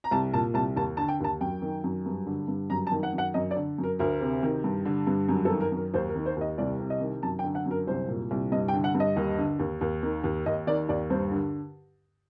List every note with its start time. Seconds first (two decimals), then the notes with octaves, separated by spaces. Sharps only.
0.04 A#5
0.11 C2 A5
0.33 A#2 A5
0.54 C2 A5
0.76 D#2 A5
0.97 D3 A5
1.08 G5
1.20 D#2 A5
1.41 F#2 G5
1.62 D#3
1.84 F#2
2.06 G2
2.26 D3
2.48 G2
2.70 F#2 A#5
2.87 A5
2.92 D#3
3.03 F#5
3.13 F#2
3.18 F#5
3.34 F#2 D#5
3.51 D5
3.56 D3
3.78 F#2
3.84 A#4
3.99 D2 A#4
4.21 C3
4.43 D#3
4.64 G2
4.85 D3
5.07 G2
5.29 F#2
5.45 A4
5.50 D#3
5.61 A#4
5.72 F#2
5.77 A#4
5.94 D#2 C5
6.09 A#4
6.15 D#3
6.26 C5
6.36 D#2 D#5
6.58 C2 D5
6.79 C3
6.90 D#5
7.00 D#3
7.23 F#2 A5
7.39 G5
7.44 D3
7.55 F#5
7.66 F#2
7.71 A#4
7.87 C2 C5
8.09 A#2
8.31 C2
8.52 G2 D#5
8.68 G5
8.73 D3
8.84 F#5
8.95 G2
9.00 D#5
9.16 D#2
9.38 D3
9.59 D#2
9.81 D#2
10.03 D#3
10.24 D#2
10.46 D#2 D#5
10.67 D#3 D5
10.89 D#2 D5
11.10 G2 C5
11.31 D3